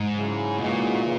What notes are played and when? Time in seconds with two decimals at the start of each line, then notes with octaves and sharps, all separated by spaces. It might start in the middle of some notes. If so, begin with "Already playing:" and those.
Already playing: G#2
0.15 C#3 F#3 C#4 E4
0.58 A#2 C#3 E3 G#3 D#4 F#4
1.02 C#3 E3